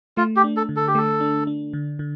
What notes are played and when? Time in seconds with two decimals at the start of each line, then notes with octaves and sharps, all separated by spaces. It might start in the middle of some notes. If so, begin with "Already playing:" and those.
0.17 A3 F4
0.36 G4
0.44 D4
0.57 A4
0.69 D3
0.76 A4
0.87 G4
0.95 A3 A4
1.21 D4
1.47 D4
1.73 D3
1.99 D3